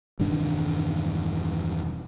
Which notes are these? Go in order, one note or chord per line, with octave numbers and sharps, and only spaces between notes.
E1 G2 D#3 D4